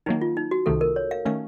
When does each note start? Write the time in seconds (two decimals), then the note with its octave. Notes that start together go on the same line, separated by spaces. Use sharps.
0.06 D#3 F#3 A#3 D#4
0.22 F4
0.37 D#4
0.51 F#4
0.66 C2 C3 D#3 A3 A4
0.81 A#4
0.96 C#5
1.11 F5
1.25 D#3 A3 C#4 F5